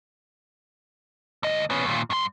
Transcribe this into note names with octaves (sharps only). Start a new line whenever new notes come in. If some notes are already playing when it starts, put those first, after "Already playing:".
D2 D#5
B3 C#4
D#2 A#2
G2 C6